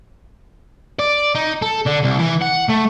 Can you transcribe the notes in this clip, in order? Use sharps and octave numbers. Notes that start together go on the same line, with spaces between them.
D5
D#4
A4
D3
C2
E3
F#5
A3